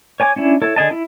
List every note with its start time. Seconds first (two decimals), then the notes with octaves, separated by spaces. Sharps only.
0.20 C#5 G#5 D6
0.36 C#4 D4 E4
0.62 E4 A4 C#5
0.76 D3 G#4 D#5 A5
0.91 E4